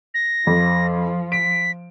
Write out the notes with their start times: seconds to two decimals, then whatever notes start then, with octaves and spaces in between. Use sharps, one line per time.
0.14 A#6
0.47 F2 F3
1.32 B6 D7